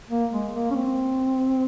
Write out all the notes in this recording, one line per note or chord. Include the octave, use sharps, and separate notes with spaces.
A#3
G#3
A#3
C#4
C4